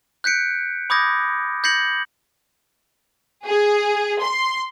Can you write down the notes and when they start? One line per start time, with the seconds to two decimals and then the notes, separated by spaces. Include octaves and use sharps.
0.24 F#6 G6 B6 C#7 D7
0.90 B5 D6 D#6 G6 G#6 A#6
1.64 G6 G#6 A#6 C7 C#7 F#7
3.47 G#4
4.22 C6